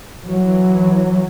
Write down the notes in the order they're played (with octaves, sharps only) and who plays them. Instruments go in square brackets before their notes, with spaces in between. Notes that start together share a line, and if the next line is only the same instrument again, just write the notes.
[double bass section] E3 F#3